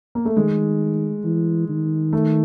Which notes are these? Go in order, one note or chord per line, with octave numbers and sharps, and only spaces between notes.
A#3
A3
D#3 G#3
E3
D#3
A3